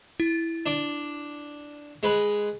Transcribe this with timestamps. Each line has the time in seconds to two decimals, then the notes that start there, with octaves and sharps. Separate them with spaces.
0.20 E4
0.66 D4 D5 D6
2.03 G#3 B4 B5